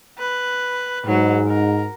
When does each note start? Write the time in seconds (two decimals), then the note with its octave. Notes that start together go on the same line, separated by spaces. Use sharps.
0.19 B4
1.06 G#2 F#3
1.48 A#4